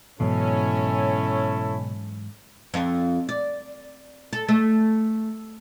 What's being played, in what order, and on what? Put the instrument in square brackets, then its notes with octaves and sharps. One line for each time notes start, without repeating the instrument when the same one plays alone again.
[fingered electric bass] G#2 E3 F#3 [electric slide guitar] B2 [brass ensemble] C#4 [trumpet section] E4 A4 C#5
[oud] F2
D5
A4
A3